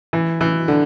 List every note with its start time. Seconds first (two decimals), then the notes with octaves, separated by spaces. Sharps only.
0.13 E3
0.41 E3
0.68 D3